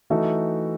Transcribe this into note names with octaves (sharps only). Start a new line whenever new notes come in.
E3 A3 D#4 F#4 A4